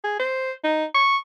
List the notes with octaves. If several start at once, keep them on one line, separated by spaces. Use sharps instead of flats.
G#4
C5
D#4
C#6